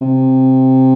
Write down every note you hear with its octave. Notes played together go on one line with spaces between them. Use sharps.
C3